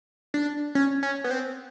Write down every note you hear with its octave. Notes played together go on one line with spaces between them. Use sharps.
D4
C#4
C#4
B3
C4